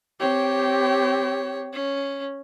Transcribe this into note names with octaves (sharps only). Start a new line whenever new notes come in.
C4 G4 C#5
C#4